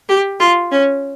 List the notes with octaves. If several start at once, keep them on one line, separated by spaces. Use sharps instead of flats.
G4
F4
C#4